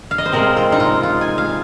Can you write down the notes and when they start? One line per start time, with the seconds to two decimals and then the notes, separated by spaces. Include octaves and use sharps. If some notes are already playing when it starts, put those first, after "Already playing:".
0.11 F5
0.18 D#5
0.26 C5
0.32 C3 G#3 C4 A#4
0.57 F4
0.72 D#4
0.80 F4
1.03 F4
1.21 G#5
1.38 F5